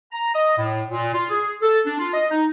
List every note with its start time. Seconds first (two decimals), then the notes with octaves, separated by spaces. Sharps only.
0.12 A#5
0.35 D#5
0.57 A2
0.90 A#2
1.14 F4
1.30 G#4
1.62 A4
1.86 D4
1.99 F4
2.14 D#5
2.31 D#4